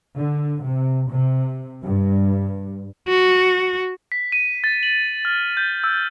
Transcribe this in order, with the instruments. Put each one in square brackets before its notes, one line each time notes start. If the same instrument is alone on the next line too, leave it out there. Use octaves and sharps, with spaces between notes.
[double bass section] D3
C3
C3
G2
[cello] F#4
[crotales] B6
D#7
A6
F#7
F6
G6
E6